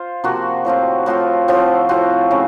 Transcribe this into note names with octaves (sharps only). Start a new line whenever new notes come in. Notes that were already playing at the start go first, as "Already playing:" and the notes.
Already playing: F4 C5
C3 F3 A#3 F#4
A2 F3 C4 F4
A2 F3 C4 F4 F#4
A2 F3 C4 F4
A2 F3 C4 F4 F#4
C#3 A3